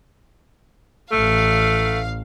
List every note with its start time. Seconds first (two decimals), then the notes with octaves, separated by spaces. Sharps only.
1.12 A1 A3 F5